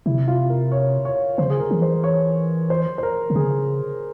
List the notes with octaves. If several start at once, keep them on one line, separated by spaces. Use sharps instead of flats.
C3 E4
F4
A#4
C#5
C#5
C#3 C5
G#4
A#4
E3
C5
C#5
C5
C5
A#4
C3
C#3 G#4